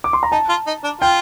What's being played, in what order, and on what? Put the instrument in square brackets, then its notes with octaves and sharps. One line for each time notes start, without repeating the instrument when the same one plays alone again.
[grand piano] D6
C6
A#5
[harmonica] D#4 [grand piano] A5
[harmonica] F4
D#4
D4
[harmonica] F4 [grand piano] G5